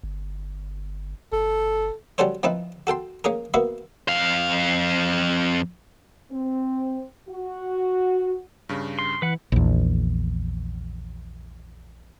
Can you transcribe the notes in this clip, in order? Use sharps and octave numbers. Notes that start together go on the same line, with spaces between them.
G1
F#1 A4
G3 C#4 F#4 A4 C5 C#5
F3 C4 D#4 E4 B4
F#4 A4 G5 C6
A#3 C#4 G#4 A#4
A#3 B3 F#4 B4 E5
F2 F5
C4
F#4
G2 C#3
C6
E3 B4 F#5
A#1 E2